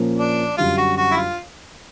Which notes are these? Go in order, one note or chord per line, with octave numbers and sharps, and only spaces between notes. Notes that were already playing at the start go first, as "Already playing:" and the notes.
Already playing: A#2 F3 A#3 C#4
D4
F#2 D3 G3 F4
F#4
F#4
E4
F4